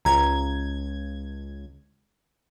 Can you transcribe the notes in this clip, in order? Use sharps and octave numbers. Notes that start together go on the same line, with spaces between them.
C#2 A#5 G#6